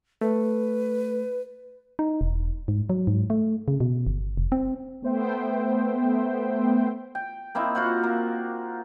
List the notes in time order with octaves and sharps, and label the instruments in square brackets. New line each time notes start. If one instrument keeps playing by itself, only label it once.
[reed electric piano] A3 [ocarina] B4
[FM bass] D#4
E1
G#2
F#3
G#2
A3
C#3
B2
G1
F1
C4
[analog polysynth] A3 B3 C5 E5 G5
[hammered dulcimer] G5
A#3 C4 D#4 E4
F4 F#4 C5 F#5
A#3 A#4